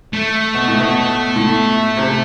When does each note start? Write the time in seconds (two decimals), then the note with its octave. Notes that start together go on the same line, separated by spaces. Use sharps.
0.13 A3
0.54 B2
0.68 A2
0.80 B2
1.36 A2
1.97 C3